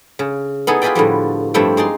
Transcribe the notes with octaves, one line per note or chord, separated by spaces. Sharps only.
C#3
B3 D#4 E4 G#4 A4
F4 G4 G#4 B4 D5 G5
A2 D3 F3 G3
G2 F3 A3 C4 E4 G5
G#3 D#4 D5 C6